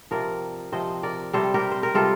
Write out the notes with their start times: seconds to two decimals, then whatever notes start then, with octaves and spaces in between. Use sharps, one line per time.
0.11 C3 F3 A#4 D5
0.72 C3 F3 C5 D#5
1.03 A#4 D5
1.33 C3 G3 A4 C5
1.54 G4 A#4
1.71 C5
1.83 A#4
1.94 C3 G3 F4 A4